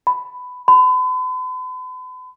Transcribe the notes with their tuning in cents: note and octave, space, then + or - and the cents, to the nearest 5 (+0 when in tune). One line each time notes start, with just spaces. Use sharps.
B5 +15
B5 +40